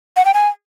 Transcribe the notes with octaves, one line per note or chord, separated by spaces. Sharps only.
F#5
G5
G#5